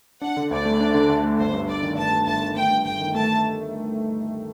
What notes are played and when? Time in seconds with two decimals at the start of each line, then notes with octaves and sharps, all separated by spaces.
0.21 D4 F#5
0.37 D3
0.51 D2 D5
0.65 A3
0.80 D4
0.94 D3
1.09 D2
1.24 A3
1.38 G1 C5
1.54 G2
1.68 G1 D5
1.83 D#3
1.97 G1 A5
2.12 G2
2.26 G1 A5
2.41 D#3
2.55 A3 G5
2.70 G2
2.85 G1 G5
3.00 D#3
3.15 A3 A5